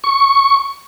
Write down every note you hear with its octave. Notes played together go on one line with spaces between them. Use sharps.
C#6